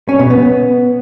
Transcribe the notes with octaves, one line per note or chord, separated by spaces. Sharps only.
C#4
B2
B3